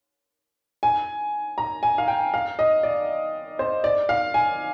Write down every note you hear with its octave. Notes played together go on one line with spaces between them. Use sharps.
G#5
A#5
G#5
F5
G5
F5
D#5
D5
C5
D5
F5
G#5